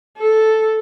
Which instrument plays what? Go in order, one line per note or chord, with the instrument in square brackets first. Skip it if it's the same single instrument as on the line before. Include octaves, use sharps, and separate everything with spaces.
[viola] A4